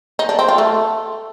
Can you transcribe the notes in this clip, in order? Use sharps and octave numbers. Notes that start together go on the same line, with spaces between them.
D#4
D4
C4
F4
A3